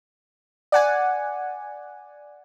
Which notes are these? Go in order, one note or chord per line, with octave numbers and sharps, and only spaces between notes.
D5 F#5 G#5